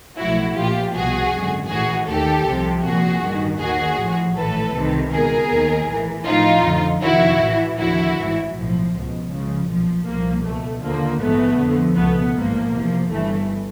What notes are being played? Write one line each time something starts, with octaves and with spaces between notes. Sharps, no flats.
B1 A2 F3 E4 F#4
A#1 A#2 F3 F4 G4
C2 B2 F#4 G#4
G#1 F#2 D3
A#1 A2 E3 F#4 G#4
D#2 D#3 G4 A4
C2 C3 F3
C2 A#2 F3 F#4 G#4
A1 G2 D#3
D#2 D#3 F#4 G#4
A1 A2 F3
A#1 A2 E3 A4 B4
C2 C3 D#3
C#2 B2 G#4 A#4
D#2 D#3
A#1 A2 E3
A1 A2 F3 D#4 F4
F2 D3 F3
F2 C3 D#3 E4 F#4
A1 A2 E3
D#2 D3 F3 E4 F#4
A1 G#2 E3
B1 A2 F3
C#2 B2
C#2 C#3 F3
B1 A#2 F3
C2 A#2 F3 A#3
C#2 B2 A3
D#2 D3 F3 A#3
A#1 G#2 E3 A3 B3
F2 D3 F3
C#2 B2 A3 B3
A1 G#2 F3 A#3
E2 C3 F3
G1 G2 E3 A3